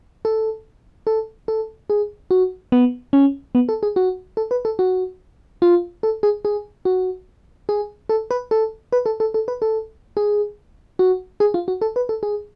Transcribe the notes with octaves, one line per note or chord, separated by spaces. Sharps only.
A4
A4
A4
G#4
F#4
B3
C#4
B3
A4
G#4
F#4
A4
B4
A4
F#4
F4
A4
G#4
G#4
F#4
G#4
A4
B4
A4
B4
A4
A4
A4
B4
A4
G#4
F#4
G#4
F4
F#4
A4
B4
A4
G#4